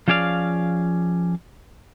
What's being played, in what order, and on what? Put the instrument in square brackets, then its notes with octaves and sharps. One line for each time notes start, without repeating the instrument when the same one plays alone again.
[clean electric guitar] F3 C#4 G#4 D5 F5